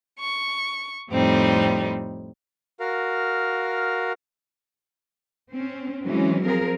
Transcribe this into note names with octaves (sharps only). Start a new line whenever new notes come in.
C#6
F2 A2 G3 C4 D#4
F#4 A#4 F5
C4 C#4
E3 F#3 G#3 C4 C#4
F3 C4 G#4 A#4